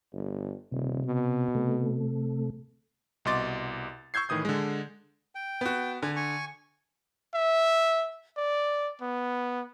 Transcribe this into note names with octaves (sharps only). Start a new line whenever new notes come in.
G1
D#1 C3
B2
C3 A3
C2 B2 D#5 C6 D6 A6
C#6 E6 G6 G#6 C7
A2 D#3 E3 D#6 G6
D3 G#3
G5
B3 F#4
D3 G#5
G#5 C#6
E5
D5
B3